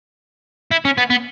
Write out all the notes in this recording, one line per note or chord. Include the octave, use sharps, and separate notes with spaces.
E4
C#4
B3
B3